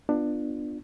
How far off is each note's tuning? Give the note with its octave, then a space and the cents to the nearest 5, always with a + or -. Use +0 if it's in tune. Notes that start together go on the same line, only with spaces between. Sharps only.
B3 +0 D4 +20 F4 +0